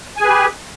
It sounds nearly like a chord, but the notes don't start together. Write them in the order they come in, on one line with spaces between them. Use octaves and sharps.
G#5 G#4 B4 G4